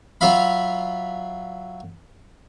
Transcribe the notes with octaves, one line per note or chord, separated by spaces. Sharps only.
F#3 F4 E5 F5 B5